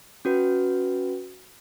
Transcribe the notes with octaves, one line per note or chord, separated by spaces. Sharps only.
C#4 F#4 B4